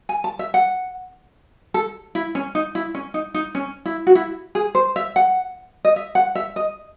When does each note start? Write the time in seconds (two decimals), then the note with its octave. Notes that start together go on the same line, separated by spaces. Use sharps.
0.09 G#5
0.24 A5
0.39 E5
0.54 F#5
1.74 A4
2.15 E4
2.35 C#4
2.55 D#4
2.75 E4
2.95 C#4
3.14 D#4
3.34 D#4
3.55 C#4
3.86 E4
4.07 F#4
4.15 E4
4.55 G#4
4.75 C5
4.96 E5
5.16 F#5
5.85 D#5
5.96 E5
6.15 F#5
6.35 E5
6.56 D#5